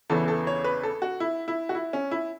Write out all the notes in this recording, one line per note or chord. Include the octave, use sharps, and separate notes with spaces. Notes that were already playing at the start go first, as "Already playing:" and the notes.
E2 C#3 E3 B3 A4
A4
C#5
B4
A4
F#4
E4
E4
F#4
E4
C#4
E4